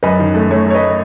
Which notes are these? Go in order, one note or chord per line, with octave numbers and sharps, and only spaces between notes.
F#2 B4 D#5
D#3
A3
A3 C#5
A3 C#5
B4 D#5